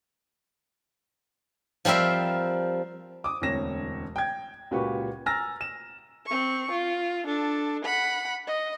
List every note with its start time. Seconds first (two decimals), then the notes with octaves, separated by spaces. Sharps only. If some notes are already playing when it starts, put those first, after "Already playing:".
1.85 F3 G3 C4 A#4 E5
3.24 D6 D#6
3.42 E1 D2 C4 C#5 A#6 E7
4.16 G5 G#6
4.71 C#2 A#2 F#4 G4 B4 C#6
5.26 G#5 A#5 E6 F6 A6 A#6
5.61 E7
6.26 C4 C#6
6.71 F4
7.24 D4 A4
7.85 F#5 B5
8.47 D#5